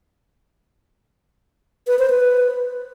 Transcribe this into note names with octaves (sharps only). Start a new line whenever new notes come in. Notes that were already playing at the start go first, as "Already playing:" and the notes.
B4
C5
B4